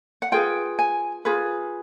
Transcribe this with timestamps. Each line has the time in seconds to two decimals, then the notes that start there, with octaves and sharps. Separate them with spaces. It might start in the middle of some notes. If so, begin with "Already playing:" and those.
0.22 F#5
0.32 F4 G#4 B4 G5
0.79 G#5
1.25 F4 G#4 B4